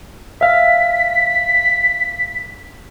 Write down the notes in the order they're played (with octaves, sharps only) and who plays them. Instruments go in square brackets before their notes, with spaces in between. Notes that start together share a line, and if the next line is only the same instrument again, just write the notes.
[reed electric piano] E5 F5 [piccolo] B6